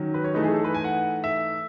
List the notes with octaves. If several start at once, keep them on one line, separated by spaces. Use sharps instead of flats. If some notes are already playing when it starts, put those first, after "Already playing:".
Already playing: D#3 F#3 C#4
B4
C#5
E3 A3 D#4 B4
G#4
A4
B4
G#5
F#5
E5